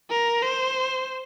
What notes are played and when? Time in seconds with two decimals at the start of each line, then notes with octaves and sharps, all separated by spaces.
0.10 A#4
0.42 C5